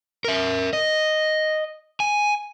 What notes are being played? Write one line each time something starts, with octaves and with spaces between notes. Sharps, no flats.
A#4 E5
D#5
G#5